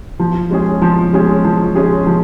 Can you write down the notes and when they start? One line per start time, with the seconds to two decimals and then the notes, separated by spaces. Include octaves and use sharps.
0.20 F3
0.50 G#3 C#4 G#4
0.82 F3
1.13 G#3 C#4 G#4
1.45 F3
1.75 G#3 C#4 G#4
2.07 F3